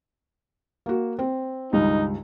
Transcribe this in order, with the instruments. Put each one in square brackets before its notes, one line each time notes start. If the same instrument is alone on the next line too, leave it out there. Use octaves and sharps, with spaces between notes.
[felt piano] A#3 F#4
C4
[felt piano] C#2 G2 D#3 [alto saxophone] D#4